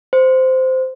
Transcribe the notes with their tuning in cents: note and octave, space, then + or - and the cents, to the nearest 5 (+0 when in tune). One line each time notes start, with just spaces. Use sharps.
C5 -10